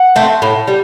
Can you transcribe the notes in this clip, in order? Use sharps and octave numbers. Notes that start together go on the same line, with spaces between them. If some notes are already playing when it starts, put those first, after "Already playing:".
Already playing: F#5
A3 C4
A2
G3